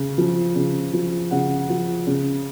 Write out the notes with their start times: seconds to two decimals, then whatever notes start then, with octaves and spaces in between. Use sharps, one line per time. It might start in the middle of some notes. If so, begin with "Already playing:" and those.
Already playing: C#3
0.18 F3
0.55 C#3
0.93 F3
1.31 C#3 F#5
1.70 F3
2.07 C#3